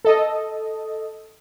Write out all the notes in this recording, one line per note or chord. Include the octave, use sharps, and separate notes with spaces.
A4 D#5